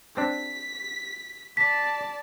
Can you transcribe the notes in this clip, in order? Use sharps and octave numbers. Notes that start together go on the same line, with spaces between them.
C4 D4 B6
D5 A5 B6